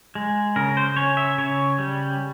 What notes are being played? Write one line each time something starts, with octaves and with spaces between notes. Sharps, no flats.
G#3
C#3 A#4
C5
C#4 C#5
E5
C#3 C#5
G3